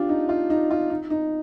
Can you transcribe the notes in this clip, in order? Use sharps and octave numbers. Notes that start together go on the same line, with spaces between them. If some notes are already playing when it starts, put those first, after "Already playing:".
Already playing: D4 F4 G4
D#4
F4
D#4
F4
D#4
D#4